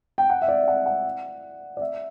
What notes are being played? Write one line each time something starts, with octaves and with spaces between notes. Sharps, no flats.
G5
F#5
E5
D5
F#5
F#5
D5
E5